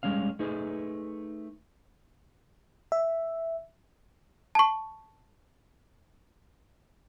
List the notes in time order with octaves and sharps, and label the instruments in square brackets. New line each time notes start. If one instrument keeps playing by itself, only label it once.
[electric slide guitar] G3 G#3 C#4 F5
A3 D#4 G#4 B4
[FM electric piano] E5
[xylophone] A5 C#6